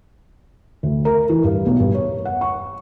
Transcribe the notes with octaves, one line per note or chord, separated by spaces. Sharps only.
D2
A#4
E3
G2
B1
G2
C#5
F#5
C#6